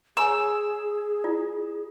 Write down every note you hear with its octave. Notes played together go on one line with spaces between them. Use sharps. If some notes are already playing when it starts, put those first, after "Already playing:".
G#4 C#5 G#5 A#5 E6
E4 F4 D5